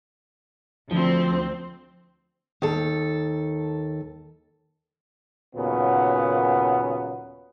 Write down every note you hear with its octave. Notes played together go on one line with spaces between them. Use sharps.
D2 F3 C4
D#2 A4
D#2 A#2 C#3 F#3 B3